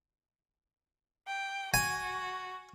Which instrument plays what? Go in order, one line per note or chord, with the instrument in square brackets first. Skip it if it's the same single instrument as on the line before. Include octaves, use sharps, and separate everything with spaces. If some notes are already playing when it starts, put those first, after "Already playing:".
[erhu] G5
[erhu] F#4 [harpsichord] G#5